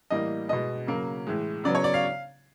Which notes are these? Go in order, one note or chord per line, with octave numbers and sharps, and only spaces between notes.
A2 E3 G3 A#3 D#5
B2 G#3 B3 D#5
C#3 F#3 A#3
A2 E3 G#3
C#3 F#3 B3 D5
C#5
D5
F5